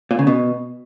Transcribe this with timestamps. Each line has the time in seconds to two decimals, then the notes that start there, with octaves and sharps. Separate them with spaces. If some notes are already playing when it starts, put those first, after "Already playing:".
0.11 A#2
0.19 C#3
0.27 B2